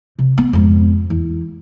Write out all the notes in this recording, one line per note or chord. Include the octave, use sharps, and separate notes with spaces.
C3
B3
F2 G#2
E2